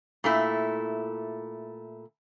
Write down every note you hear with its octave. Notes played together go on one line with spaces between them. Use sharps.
A#2 A3 E4